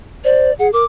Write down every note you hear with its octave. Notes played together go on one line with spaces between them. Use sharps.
C5 D5
G#4 F#5
A#4 D6